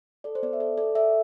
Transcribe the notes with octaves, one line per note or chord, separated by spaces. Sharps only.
A4 D5
C5
B3 D5
E5
A4 D5
A4 D5
A4 E5